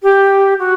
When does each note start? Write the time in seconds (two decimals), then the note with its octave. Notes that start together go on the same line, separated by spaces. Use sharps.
0.03 G4
0.59 F#4